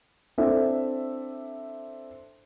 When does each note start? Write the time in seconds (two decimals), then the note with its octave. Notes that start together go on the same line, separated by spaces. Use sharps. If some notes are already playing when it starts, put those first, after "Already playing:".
0.38 C4 D4 E4 A4 E5